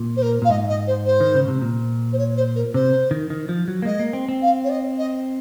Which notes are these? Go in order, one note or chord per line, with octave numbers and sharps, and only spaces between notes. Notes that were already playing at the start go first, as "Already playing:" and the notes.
Already playing: A#2
C5
A#4
A#2 F5
G#2 D#5
D#5
C5
C5
D#3
C#3
C3
A#2
C5
C#5
C5
A#4
C3 C5
D#3
D#3
F3
F#3
A#3
G#3 D#5
A#3
C4
C4
F5
C#5
D#5
D#5